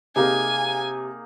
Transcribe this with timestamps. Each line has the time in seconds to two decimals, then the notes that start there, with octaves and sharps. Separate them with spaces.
0.16 C3 A#3 D#4 G#4 G#5